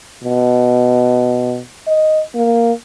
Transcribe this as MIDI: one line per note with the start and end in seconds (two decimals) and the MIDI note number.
0.24 1.60 47
1.87 2.21 75
2.35 2.72 58